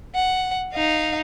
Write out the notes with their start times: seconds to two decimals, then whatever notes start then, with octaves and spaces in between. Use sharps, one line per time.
0.15 F#5
0.73 D#4 F5